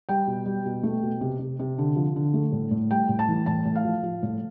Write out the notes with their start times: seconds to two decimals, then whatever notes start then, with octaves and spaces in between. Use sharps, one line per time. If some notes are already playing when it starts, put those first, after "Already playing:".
0.09 G3 G5
0.27 B2
0.46 G3
0.65 B2
0.83 A3
1.03 B2
1.21 C3
1.39 C3
1.59 C3
1.78 D3
1.96 F3
2.16 D3
2.34 A3
2.52 A2
2.71 A2
2.90 G3 G5
3.09 A2
3.19 A5
3.28 E3
3.46 A2 A5
3.65 A2
3.76 F5
3.85 F3
4.03 F3
4.23 A2